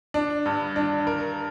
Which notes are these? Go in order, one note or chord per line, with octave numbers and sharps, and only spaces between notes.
D4
G2
D4
A#4